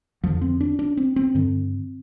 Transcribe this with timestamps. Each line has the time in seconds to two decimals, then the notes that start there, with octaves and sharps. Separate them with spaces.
0.23 F2 D3 F3
0.41 C4
0.60 D4
0.79 D4
0.97 C4
1.16 C4
1.34 G2 D3